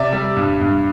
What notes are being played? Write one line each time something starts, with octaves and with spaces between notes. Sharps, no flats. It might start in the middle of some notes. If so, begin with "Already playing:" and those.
Already playing: C3 D5 E5
G3
G2
G2